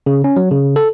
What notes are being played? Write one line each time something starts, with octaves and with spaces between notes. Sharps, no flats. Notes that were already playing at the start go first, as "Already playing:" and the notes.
C#3
C#4
F#3
C#3
A4